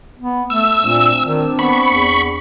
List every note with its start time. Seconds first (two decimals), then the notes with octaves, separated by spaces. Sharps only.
0.19 B3
0.50 A3 E6
0.86 A#2 C4 D4
1.24 D#3
1.59 B3 B5 C#6
1.93 E2